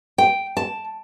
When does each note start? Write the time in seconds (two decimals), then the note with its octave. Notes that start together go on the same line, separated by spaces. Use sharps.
0.18 G5
0.57 A5